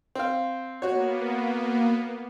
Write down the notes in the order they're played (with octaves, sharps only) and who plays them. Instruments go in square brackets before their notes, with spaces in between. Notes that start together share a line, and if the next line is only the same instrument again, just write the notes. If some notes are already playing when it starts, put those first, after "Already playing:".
[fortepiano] C4 F5
[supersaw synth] A#3 B3 [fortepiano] F#4 C#5